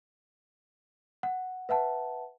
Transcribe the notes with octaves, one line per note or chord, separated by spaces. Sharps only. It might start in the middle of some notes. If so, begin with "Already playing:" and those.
F#5
B4 E5 F#5 A5